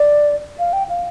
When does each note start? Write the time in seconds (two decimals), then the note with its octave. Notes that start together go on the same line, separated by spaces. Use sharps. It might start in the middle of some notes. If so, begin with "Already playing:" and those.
Already playing: D5
0.59 F5
0.73 G5
0.89 F5